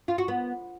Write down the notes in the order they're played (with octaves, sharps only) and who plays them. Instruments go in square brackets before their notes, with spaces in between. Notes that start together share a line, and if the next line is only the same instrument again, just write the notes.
[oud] F4
F#4
B3